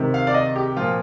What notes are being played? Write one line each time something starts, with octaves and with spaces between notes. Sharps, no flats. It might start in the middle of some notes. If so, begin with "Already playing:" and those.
Already playing: C3 D#3
F5
D5
D#5
G4
A#2 F3 F4